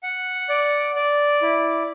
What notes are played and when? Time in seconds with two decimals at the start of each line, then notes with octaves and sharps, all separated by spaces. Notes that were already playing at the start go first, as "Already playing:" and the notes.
0.03 F#5
0.49 D5
0.96 D5
1.42 E4